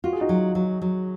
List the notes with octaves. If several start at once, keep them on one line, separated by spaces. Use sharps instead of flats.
F4 F#4
G#4
D#4 F#4
F#3
F#3
F#3